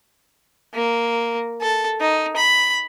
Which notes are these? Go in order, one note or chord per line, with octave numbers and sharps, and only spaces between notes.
A#3
A4
D#4
B5